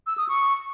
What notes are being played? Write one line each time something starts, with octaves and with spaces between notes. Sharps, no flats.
E6
D#6
C#6